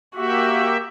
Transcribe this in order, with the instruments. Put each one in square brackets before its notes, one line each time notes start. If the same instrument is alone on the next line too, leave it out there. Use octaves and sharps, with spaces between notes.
[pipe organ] A#3 G4 E5 [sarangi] F#4